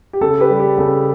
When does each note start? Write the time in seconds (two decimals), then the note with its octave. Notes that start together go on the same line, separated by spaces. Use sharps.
0.13 G4
0.21 C#3 A4
0.40 G4 B4
0.50 G3
0.60 G4
0.78 C#3 A4